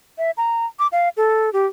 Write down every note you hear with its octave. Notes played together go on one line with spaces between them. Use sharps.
E5
A#5
D6
F5
A4
G4